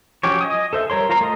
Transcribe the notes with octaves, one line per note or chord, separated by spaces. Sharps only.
F3 F#3 C#4 G4 C#5
D#5 G#5 D#6
A4 C5 E5
G3 A#4 C#5 C6
F4 A#4 C5 A#5 C6
A3 D#5